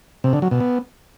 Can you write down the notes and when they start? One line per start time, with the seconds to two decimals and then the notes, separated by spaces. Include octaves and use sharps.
0.24 C3
0.33 D3
0.42 F#3
0.51 B2
0.60 B3